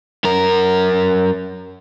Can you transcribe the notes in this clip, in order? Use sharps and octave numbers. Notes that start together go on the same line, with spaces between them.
F#2 A#4